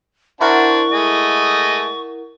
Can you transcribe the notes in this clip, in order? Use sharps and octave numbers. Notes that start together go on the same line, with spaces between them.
D4 E4 F#4 A#4 C5 F#5 C#6
G#3 A3 D#5